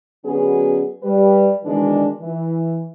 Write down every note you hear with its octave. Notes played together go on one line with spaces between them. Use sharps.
D3 F#3 B3 C#4 F#4 G#4
G3 B4
B2 D#3 E3 G#3 D4
E3